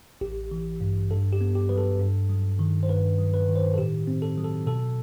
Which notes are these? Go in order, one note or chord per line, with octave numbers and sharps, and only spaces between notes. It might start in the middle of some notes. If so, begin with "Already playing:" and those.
A1 G4
E3
G2
G2 A4
G4
B3
G4
F#3 B4
A4
G2
F#3
D#3
C5
G2 B4
F#3
B4
D#3
C5
A4
A2 G4
C4
A4
F#3
A4
B2 A4